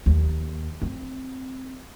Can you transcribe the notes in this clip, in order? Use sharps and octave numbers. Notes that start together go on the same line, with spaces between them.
D#2
C4